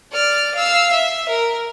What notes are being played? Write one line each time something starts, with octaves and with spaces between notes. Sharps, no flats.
D5 F6
F5 E6
E5
A#4